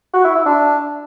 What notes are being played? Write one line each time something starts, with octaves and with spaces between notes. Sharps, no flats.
F#4
E4
E4
D4